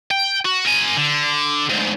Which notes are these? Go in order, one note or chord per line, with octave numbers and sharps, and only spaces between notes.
G5
F#4
A#4 G#5
D3
D2 G#2